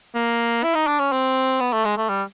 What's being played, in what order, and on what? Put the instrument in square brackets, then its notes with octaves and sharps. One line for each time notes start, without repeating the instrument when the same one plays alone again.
[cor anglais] A#3
E4
D#4
D4
C#4
C4
B3
A3
G#3
A3
G3